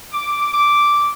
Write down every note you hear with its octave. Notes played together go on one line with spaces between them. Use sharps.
D6
D6